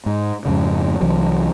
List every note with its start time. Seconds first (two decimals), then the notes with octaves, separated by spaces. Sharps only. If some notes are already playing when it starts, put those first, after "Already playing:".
0.06 G#2
0.45 F2 G#2 C#3
1.01 C2 E3 F#3